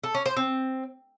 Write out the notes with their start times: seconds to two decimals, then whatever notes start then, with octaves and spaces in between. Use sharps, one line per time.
0.04 A4
0.15 C#4
0.26 C5
0.37 C4